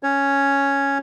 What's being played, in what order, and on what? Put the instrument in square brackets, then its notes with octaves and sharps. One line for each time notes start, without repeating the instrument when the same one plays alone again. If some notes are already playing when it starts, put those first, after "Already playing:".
[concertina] C#4 C#5